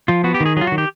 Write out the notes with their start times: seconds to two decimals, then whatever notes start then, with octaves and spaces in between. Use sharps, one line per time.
0.08 F3 F4
0.24 B3 F#4
0.34 G4
0.40 D#3
0.46 G#4
0.57 F#3 F4 G#4
0.67 D#3 F#4
0.78 G4